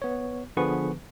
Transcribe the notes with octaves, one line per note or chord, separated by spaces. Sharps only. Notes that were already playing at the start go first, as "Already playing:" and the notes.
B3 C#5
D3 F3 B3 G#4 B4 C#6